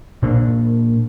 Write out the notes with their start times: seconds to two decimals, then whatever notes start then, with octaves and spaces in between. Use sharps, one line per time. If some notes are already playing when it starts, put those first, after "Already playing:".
0.22 A#2 D4